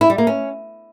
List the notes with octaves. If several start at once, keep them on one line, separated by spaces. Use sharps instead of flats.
E4
G3
A#3
C#4